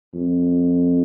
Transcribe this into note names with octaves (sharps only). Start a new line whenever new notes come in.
F2